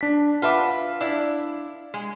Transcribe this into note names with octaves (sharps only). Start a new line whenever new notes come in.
D4 B6
F4 B4 E5 F#5 A5 D6
F5
D4 E4
G#3